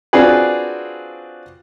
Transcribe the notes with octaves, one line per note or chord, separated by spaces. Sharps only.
C4 D4 F4 F#4 G#4 B4